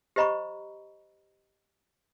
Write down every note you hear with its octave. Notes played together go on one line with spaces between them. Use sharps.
G4 C5 D#5 A#5 B5 C#6